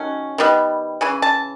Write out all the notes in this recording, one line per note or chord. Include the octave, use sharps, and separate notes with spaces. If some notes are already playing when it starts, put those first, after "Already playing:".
Already playing: D#3 F#3 A3 C#4
D#3 G3 B3
C#3 E3 G#5
A5